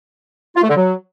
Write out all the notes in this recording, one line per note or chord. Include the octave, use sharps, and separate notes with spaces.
F4
A3
D3
F#3